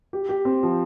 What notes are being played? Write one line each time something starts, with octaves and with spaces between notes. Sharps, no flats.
G4
G4
C4
F3